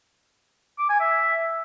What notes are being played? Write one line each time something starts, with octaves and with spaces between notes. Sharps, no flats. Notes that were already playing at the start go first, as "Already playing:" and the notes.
D6
G#5
E5